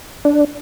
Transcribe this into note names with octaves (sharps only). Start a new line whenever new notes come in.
D4